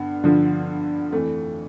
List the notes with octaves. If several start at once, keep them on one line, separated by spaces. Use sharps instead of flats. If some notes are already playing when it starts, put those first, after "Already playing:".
Already playing: G2 D3 B3
G2 D3 F3
F2 E3 A3